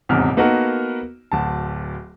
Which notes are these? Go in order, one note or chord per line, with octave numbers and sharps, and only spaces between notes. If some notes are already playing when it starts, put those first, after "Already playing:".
D#1 E2 G#2 C3 F6
A#3 B3 D#4 F#4 A4 A#4
D1 D2 A5